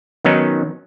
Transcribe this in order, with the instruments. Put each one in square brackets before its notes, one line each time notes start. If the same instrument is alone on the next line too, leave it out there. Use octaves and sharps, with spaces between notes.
[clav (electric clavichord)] D#3 F#3 B3 C#4 D#4